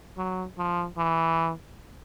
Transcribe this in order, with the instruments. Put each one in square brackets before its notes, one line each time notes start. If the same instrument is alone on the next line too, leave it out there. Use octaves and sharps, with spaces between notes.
[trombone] F#3
F3
E3